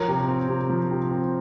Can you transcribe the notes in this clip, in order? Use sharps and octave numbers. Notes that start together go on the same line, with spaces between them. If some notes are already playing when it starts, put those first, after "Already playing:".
Already playing: F3 A#4 C#5
C3
C4
C3
F3
C3
C4